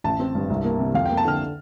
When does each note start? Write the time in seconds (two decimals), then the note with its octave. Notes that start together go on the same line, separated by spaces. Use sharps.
0.04 A1 A5
0.20 C4
0.35 G2
0.50 C2
0.65 A#3
0.79 C3
0.94 F2 F5
1.06 A#3 G5
1.17 A5
1.25 D3 F6